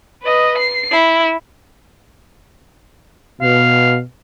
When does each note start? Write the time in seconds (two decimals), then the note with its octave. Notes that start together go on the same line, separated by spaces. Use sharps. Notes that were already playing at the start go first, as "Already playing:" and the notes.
0.23 B4 D#5
0.58 C7
0.92 E4
3.41 B2 F5